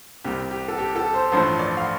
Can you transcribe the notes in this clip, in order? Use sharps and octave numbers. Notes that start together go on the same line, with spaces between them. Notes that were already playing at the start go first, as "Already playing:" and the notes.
C2 C3 G3 G4
G4
A4
G4
A4
C5
A1 G2 F3 A3 C5
D5
F5